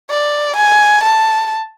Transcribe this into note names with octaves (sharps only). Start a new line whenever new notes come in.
D5
G#5
A5